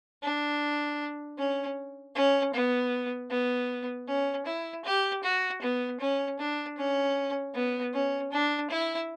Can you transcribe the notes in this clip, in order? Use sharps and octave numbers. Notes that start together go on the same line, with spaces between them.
D4
C#4
C#4
B3
B3
C#4
E4
G4
F#4
B3
C#4
D4
C#4
B3
C#4
D4
E4